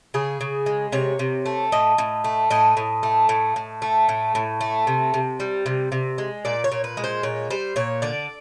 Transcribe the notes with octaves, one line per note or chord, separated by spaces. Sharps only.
C#3 G#4
C#3
G#3
C3 C#5
C3
A3
A2 D#5
A2
A3
A2 D#5
A2
A3
A2
A2
A3
A2
A2
A3
C3
C3
G3
C3
C3
G#3
A#2 D5
C#5
A#2
B4
G#3
C5
A#2 C#5
G3 C5
A#2 C#5
D3 D5